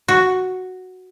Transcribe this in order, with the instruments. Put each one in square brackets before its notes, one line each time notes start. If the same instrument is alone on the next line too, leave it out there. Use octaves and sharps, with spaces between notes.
[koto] F#4